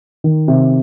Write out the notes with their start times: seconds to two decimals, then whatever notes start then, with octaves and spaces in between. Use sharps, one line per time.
0.24 D#3
0.48 C3